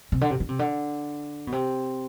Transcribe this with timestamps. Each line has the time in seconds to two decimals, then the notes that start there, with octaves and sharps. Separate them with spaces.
0.12 C3
0.21 D3
0.31 C3
0.40 D3
0.49 C3
0.59 D3
1.47 B2
1.52 C3